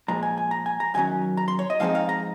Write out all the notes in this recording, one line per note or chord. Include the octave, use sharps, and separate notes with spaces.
A#2 F3 G#3 A#5
G#5
G#5
A#5
G#5
A#5
F#2 D#3 F#3 C#4 G#5
A#5
C6
C#5
D#5
G#2 F3 G#3 C4 D#4 F5
F5
A#5